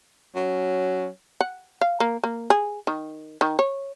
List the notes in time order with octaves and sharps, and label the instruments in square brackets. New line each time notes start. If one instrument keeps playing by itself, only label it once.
[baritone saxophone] F#3 [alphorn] C#4
[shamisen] F#5
F5
A#3
A#3
G#4
D#3
D#3
C#5